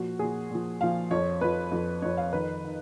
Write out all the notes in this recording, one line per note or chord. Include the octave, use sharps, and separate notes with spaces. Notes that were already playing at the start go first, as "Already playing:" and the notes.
Already playing: A#2 F3 F#4
A#2 F3 G#4
A#2 F3
A#2 F3 F5
F2 F3 C#5
F2 F3 B4
F2 F3
F2 F3 C#5
F5
F2 D#3 B4
D#3